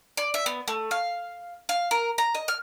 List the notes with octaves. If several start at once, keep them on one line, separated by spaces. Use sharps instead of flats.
D5
E5
B3
A3
F5
F5
A#4
A#5
D#5
F6